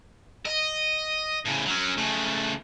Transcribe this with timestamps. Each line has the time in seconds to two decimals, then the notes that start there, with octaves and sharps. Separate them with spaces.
0.45 D#5
1.45 A2 C#3
1.66 F#3 C#4
1.98 C#3 A3